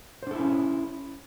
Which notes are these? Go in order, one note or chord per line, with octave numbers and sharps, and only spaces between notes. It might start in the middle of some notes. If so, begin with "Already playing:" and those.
C#4 D4 E4 A4 C5